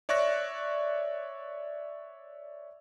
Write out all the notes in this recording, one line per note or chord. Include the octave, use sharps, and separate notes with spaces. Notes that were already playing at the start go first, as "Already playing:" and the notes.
C#5 D5 E5 C#6 F#6 A#6